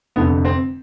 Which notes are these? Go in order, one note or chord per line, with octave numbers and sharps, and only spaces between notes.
F1 F2 D3 B3
C4